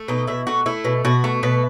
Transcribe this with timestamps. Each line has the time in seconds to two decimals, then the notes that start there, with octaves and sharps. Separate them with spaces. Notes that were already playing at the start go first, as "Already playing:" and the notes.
Already playing: A3
0.08 B2 D#4
0.27 B2 E4
0.47 A3 F#4
0.66 A3 E4
0.84 B2
1.05 B2 F#4
1.24 A3
1.43 B2 B4